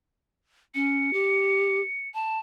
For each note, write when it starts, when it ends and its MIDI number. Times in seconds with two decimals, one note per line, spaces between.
0.75 1.13 61
0.75 2.08 97
1.13 1.80 67
2.14 2.39 81